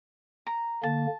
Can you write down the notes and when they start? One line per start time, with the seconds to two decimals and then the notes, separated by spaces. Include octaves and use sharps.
0.47 A#5
0.83 D3 A#3 A5